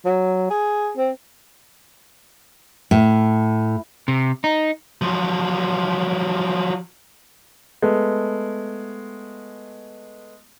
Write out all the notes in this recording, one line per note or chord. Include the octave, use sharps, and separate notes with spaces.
F#3
G#4
C4
A2
C3
D#4
F3 F#3
G#3 A3 B3